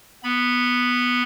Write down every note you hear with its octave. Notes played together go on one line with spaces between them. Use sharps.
B3 B5